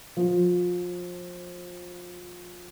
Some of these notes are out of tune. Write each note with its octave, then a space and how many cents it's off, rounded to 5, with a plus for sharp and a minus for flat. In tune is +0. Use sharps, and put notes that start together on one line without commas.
F3 +25